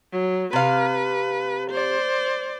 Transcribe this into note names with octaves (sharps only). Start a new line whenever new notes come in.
F#3
C3 B4 F5
C5 D5